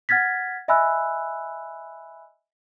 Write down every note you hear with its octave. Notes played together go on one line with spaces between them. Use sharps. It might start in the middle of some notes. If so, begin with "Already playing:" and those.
F#5 F6 G#6 A6 B6
D#5 E5 G#5 B5 E6 F#6